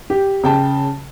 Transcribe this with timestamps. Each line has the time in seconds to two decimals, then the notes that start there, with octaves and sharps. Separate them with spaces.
0.10 G4
0.44 C#3 G5 A5